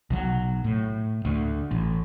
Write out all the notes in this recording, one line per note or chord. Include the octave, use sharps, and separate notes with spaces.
B1 F#3
A2
D2
A1